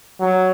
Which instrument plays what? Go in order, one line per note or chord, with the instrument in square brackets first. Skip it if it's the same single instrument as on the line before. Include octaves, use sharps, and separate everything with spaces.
[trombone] F#3